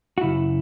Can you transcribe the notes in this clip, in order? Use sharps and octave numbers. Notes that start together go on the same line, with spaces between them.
F#4
F#2 C#3 E4